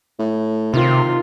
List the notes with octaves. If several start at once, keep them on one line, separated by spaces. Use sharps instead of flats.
A2
C3 D#3 F4